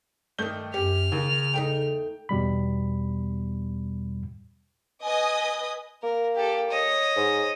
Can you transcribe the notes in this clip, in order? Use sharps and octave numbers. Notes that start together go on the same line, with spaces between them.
G2 D#3 A3 G6 G7
F#2 C#4 G4 F6
D#2 C#3
E2 A3 D#4 G5
E2 B2 G3 B5
B4 D#5 G#5 D#6
A#3 A#4
G4 A4
C#5 D#5
G#2